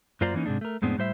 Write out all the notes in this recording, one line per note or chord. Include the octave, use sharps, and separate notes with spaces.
F#2 A#3 F4 C5 D5 A#5
E3 A#3 C#4 D#4
G#2 C3 G#3 D4
A3 A#4
F2 A2 G#3 B3 C4 D4
A2 G3 C5 E5